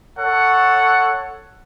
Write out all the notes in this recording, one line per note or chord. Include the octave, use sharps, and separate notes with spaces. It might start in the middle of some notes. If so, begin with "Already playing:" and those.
A4 C#5 F#5